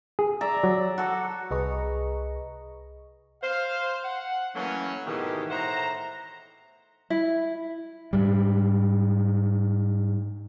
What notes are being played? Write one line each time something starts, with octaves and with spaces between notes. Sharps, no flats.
G#4
D5 E5 A#5
F#3
F#4 A4
C2 G#4 B4 D#5 A#5 C#6
C5 F5
F#5
E3 F#3 A3 A#3 C#4
G#2 B2 D#3 E3 A3 G4
A2 C5 E5 F#5 A#5
E4
G#2 G3